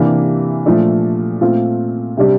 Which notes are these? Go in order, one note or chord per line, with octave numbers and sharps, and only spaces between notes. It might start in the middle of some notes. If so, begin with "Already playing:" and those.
Already playing: C3 E3 A#3 D4 G4
A#2 F3 A3 D4
A#2 A3 C4 F4
C3 G3 D4 G4